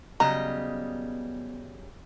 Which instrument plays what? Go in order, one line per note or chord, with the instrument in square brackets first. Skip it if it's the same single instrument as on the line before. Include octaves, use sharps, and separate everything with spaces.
[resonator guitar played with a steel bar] C#3 F#3 G3 [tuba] B3 [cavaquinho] D#5 [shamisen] A#5